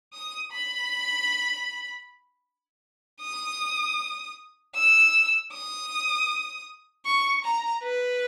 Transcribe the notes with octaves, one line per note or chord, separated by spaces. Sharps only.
D#6
B5
D#6
E6
D#6
C#6
A#5
B4